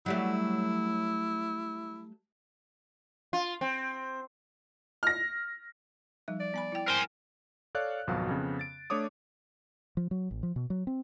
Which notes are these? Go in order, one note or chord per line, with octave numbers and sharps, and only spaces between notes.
F#3 G3 A3 E4
F4
C4
F6 A#6
F3 G3 D#4
D5
B3 G#5 B5
E4 G5
A#4 C5 G#5
A4 C#5 D5 F5 F#6
G#1 F2 B2 F#3 F#4 F5
F2 C#3 B3
A6 D7
A3 D4 C#5 D6 D#6
F3
F#3
A1
F3
B2
F#3
C4